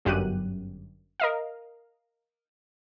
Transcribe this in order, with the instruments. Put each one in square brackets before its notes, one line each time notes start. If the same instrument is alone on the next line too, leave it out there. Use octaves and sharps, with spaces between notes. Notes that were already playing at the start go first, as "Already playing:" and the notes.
[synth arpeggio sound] G1 F#2 G4 F#6 D#7
A#4 D#5 F5